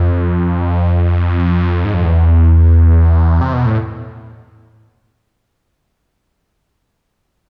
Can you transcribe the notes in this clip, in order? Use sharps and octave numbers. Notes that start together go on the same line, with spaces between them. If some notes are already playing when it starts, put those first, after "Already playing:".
Already playing: F2
G#2
F2
E2
C3
B2
A2